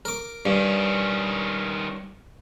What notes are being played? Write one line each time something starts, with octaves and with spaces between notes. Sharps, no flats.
A#4 D6
G2 D#3 C#4